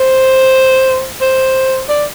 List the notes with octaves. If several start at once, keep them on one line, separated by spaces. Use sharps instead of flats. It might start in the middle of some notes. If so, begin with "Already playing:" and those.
Already playing: C5
C5
D5